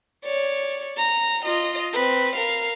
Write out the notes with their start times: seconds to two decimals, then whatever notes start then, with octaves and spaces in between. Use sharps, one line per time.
0.24 C#5 D5
0.97 A#5
1.45 F4 D#5
1.93 C4 B4
2.36 A#4 F5